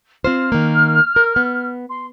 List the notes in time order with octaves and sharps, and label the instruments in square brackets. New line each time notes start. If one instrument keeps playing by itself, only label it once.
[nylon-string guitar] C4 F4 C5 [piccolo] F6
[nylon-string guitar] D#3 A#3
A#4
B3
[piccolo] C6